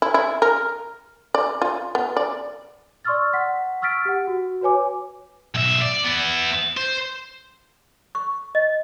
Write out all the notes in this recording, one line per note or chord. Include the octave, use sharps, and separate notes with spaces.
E4
E4
A#4
D5
F4
B3
D5
D5 C6 C#6 E6 F6 A6
F#5 B6
C#6 E6 F6 A6 B6 D7
G4 F#5
F#4
F#4 B4 C#5 G#5 D6
B1 E5
D5
B3 E4
C5
C#6
D#5